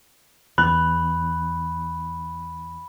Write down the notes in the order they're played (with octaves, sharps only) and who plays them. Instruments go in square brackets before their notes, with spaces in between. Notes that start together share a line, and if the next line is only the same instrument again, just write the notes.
[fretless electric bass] E2 [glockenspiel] B5 [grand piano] F#6